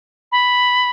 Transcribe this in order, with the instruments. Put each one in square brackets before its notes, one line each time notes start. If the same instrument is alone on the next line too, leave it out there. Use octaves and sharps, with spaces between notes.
[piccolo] B5